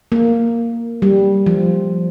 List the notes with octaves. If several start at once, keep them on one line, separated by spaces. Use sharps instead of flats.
A#3
G3
F3